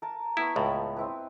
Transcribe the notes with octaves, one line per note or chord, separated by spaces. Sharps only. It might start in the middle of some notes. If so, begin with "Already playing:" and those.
A#4 A5
B3 E4 B4 C#6
C#2 A2
C4 E4 B4